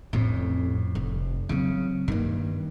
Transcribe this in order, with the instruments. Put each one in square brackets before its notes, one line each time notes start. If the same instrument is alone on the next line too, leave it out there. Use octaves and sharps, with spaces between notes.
[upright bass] A1 C4 [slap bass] F2 A2
[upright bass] F1
[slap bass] C#3 [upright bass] F#3 C4
[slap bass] G2 [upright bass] D#3 A#3